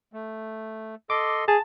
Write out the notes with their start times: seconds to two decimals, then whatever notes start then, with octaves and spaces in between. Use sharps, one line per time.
0.13 A3
1.10 A4 D#5 C6 D6
1.48 G#4 A5